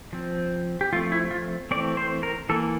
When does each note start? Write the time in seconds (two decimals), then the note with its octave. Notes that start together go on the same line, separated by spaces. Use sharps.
0.13 F3 C4
0.81 G4
0.93 F3 A3 C4 F4
1.12 E4
1.31 F4
1.71 E3 A3 C4 D5
1.97 C5
2.23 A#4
2.49 E3 A#3 A4